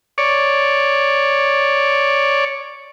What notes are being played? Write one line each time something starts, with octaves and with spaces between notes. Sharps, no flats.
C#5 D5